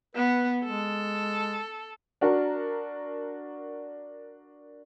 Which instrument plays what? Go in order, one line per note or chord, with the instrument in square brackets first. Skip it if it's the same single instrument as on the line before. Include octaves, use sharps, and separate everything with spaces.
[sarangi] B3 [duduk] B4
[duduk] G#3 [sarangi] A4
[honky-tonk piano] D4 F#4 A#4